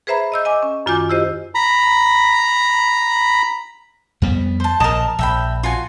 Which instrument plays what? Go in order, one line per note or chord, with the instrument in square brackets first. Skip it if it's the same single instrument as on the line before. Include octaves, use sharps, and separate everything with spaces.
[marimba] G#4 B4 C5 E5 A#5 B5
D#5 E6 G6
D#5 G#5 D6
C#4
F#2 D#3 F4 G#5 D6 G6
E4 F4 G4 C5 D#5
[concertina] A#5 B5
[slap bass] F2 G3 B3
[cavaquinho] C5 A5
[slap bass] A#1 [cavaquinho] A#4 D#5 [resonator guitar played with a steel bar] A5
[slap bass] A#1 [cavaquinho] E5 G5 B5
[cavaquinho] F4 F#4 G#5